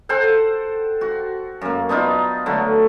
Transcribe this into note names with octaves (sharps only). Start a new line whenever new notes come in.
A4 C5 F#5 G5
F#4
F#2 A#3
B3 D4 D#4 F4
D3 F#3 A3